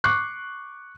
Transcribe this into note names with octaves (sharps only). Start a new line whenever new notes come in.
C#6 D6 F#6 C7